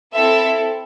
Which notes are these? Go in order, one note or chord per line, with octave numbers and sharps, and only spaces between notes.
C4 E4 A4 E5